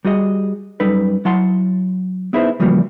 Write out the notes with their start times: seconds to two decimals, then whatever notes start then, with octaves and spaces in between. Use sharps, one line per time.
0.05 G3 F#4 G#4 D#5
0.80 F#2 G3 D#4 A4 B4
1.25 F#3 E4 F#5 A5 C6
2.33 B3 D#4 E4 G#4 B4 C5
2.60 C#3 E3 F3 G3 A#3 F#4